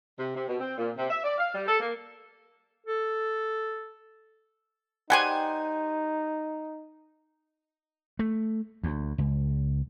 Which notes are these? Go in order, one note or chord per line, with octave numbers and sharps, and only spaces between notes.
C3
C3
B2
C4
A#2
C3
E5
D5
F5
G3
A4
A#3
A4
G3 D#4 G4 C5 F#5 G#5
A3
D2
C#2